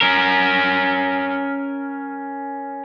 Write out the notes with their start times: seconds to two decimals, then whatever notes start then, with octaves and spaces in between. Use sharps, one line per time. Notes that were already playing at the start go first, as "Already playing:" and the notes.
0.01 C#4 A#4